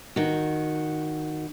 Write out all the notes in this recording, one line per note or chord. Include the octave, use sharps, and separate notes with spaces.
D#3 F#4